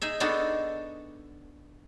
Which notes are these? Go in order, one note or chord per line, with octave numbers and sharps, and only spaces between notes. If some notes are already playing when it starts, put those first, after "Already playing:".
D#4 G#4 E5
B3 D4 D#4 F#4 G#4 A4